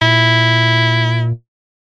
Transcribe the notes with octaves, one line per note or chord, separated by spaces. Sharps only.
A#2 E4